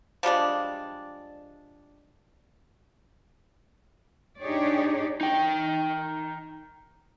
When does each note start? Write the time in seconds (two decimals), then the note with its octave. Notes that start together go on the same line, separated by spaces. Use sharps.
0.23 F3 G3 G#3 D4
4.40 D4 D#4 G4 G#4 C#5 D5
5.21 D#4 G5